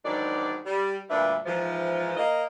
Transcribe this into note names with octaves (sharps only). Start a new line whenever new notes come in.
E2 G#2 D#3 F#3 D4 D5
G3
D2 G2 A#2 D4 B4 E5
G#2 E3 F3
A#3 D#5